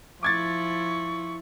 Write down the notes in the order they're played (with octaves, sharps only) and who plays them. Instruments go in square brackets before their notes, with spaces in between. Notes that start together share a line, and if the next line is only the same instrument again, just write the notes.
[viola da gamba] F3 E4 [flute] C#6 [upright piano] D6 G#6 A6